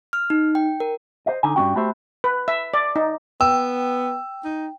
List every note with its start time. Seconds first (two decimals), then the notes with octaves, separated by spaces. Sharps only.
0.13 F6
0.30 D#4
0.55 G5
0.80 A#4
1.26 C5 D#5
1.43 D3 D#4 G#5
1.56 G2 G3 A#3 C#4 F#4 G5
1.76 A3 B3 F#4 G4 C5 E5
2.24 B4
2.48 E5
2.74 D5
2.96 D#4
3.41 B3 G5 E6
4.44 D#4